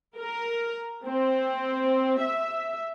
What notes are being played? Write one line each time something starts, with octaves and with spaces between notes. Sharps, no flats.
A#4
C4
E5